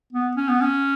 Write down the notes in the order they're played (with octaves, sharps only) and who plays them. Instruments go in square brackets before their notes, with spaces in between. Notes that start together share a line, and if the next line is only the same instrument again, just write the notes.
[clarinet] B3
C#4
B3
C#4